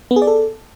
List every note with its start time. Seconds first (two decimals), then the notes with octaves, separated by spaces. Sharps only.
0.11 B3
0.16 G#4
0.22 D5
0.27 A4